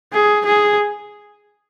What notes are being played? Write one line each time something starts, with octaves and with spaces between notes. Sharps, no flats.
G#4
G#4